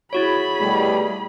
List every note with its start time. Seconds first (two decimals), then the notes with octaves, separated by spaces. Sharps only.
0.13 E4 F#4 G#4 C#5 B5
0.60 B2 G3 A3